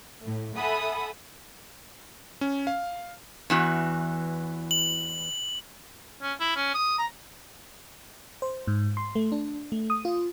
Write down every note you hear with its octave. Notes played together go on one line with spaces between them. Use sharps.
A2 A3
A4 E5 F#5 G#5 B5 D#6
C#4
F5
E2 E3 F#4
F#7
C#4
E4
C#4
D#6
A#5
C5
G#2
C6
A3
D4
A3
D#6
F4